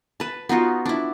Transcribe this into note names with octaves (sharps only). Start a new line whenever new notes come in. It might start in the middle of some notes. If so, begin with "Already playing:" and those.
B4 A5
B3 D#4 F4 F#4
D4 E4